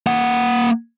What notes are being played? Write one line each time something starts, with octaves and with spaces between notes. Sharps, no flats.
A#3 F#5